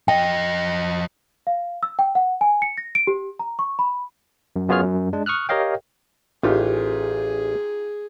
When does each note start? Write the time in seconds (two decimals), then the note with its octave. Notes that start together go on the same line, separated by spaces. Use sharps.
0.08 F2 D#5 G5
1.47 F5
1.83 E6
1.99 G5
2.15 F#5
2.41 G#5
2.62 C#7
2.78 A#6
2.95 D7
3.07 G4
3.39 A#5
3.59 C#6
3.79 B5
4.56 F#2
4.69 F#2 B3 F4 G#4 C#5 F6
4.82 F#2
5.13 G#3 D4
5.26 C#6 D#6 F6 F#6
5.49 G4 A#4 C#5 D#5 F5 G5
6.43 A1 D#4 F4 G4 G#4